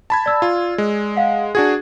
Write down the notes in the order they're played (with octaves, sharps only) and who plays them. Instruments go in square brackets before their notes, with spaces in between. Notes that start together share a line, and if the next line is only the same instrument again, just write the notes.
[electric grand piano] A5 B5 G#6
[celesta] D5 E6
[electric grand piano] F4
G#3
[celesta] F5 F#5
[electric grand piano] D4 F#4 G#4 [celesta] G#6